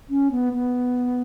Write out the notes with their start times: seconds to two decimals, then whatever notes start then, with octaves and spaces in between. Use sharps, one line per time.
0.09 C#4
0.31 B3
0.53 B3